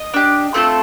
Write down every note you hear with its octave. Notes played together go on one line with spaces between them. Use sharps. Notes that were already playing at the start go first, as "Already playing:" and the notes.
Already playing: D#5
D4 G4
A3 C4 F4 A4